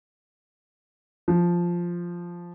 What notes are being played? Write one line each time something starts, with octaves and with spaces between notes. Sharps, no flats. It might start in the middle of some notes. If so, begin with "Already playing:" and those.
F3